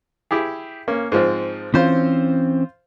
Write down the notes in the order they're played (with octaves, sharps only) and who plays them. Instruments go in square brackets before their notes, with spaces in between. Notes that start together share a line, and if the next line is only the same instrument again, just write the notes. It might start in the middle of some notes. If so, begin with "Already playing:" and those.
[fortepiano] E4 G4 G#4
A#3 C#4
G#2 F3 C4
[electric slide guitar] E3 C4 C#4 [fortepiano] F4 C5